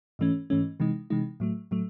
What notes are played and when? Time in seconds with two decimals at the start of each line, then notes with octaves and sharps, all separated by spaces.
0.19 G#2 E3 A3 C#4
0.50 G#2 E3 A3 C#4
0.80 C3 E3 G#3 D#4
1.10 C3 E3 G#3 D#4
1.40 A2 F#3 A3
1.71 A2 F#3 A3